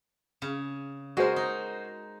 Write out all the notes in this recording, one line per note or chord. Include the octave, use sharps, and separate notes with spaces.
C#3
G#3 F#4 G#4 A#4 C5
D#4